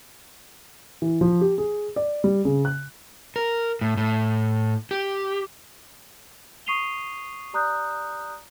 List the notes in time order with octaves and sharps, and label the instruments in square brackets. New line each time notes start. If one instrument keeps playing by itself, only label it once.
[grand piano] E3
F3
G4
G#4
D5
G3
C#3
F#6
[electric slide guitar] A#4
A2
A2
G4
[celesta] C#6 D#6 C7 D#7 F7 G7
G4 D5 A#5 D#6 F#6 G6